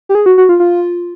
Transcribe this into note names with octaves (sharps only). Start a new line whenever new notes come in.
G4
G#4
F#4
F#4
F4
F4